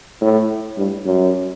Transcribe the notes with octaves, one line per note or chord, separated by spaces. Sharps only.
A2
G2
F#2